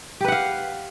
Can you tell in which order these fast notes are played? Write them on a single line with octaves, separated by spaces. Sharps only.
G4 B4 F#5 F5